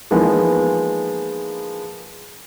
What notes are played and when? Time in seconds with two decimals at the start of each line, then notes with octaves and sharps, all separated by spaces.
0.11 E3 F3 G#3 A#3 B3 D#4